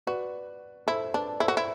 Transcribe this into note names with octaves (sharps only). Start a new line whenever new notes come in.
F#4 B4 D5
E4 A4 C5
D4 B4 D5
E4 A4 C5
F#4
E4